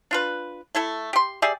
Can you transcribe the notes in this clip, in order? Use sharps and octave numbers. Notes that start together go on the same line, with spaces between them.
D4 F4 B4
A3 E4 A4
G4 C6
G4 G#4 D5 E5